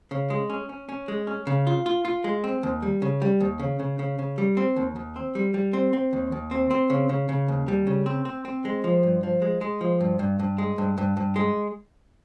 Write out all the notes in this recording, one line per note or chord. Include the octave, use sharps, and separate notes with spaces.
C#3
G#3
C#4
C#4
C#4
G#3
C#4
C#3
F4
F4
F4
G#3
C4
D#2
G3
C#3
G3
D#2
C#3
C#3
C#3
C#3
G3
C4
D#2
D#2
C4
G3
G3
C4
C4
D#2
D#2
C4
C4
C#3
C#3
C#3
D#2
G3
C#3
C4
C4
C4
G#3
F3
G2
F3
G#3
G#3
F3
G2
G2
G2
G#3
G2
G2
G2
G#3